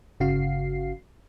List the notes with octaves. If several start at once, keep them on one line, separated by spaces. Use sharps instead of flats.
G1 C#3 F#4 F5 C7